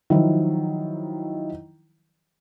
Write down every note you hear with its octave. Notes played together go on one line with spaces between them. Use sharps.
D#3 F3 F#3 E4